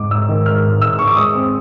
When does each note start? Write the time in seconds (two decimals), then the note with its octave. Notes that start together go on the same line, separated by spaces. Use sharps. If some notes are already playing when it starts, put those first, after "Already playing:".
Already playing: G#2 G#3 D6
0.11 G#2 E6
0.29 D#3
0.46 G#3 F6
0.64 G#2
0.82 G#2 E6
0.99 D#3 C#6
1.07 D6
1.16 G#3 D#6
1.34 C4